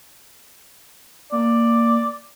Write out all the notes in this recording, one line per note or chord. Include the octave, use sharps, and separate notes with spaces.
A#3 D5